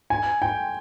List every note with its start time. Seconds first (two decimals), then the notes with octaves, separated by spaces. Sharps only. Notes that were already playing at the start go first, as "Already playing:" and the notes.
0.10 G#5
0.42 G5